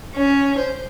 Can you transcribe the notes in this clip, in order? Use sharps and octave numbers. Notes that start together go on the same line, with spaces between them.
C#4
C5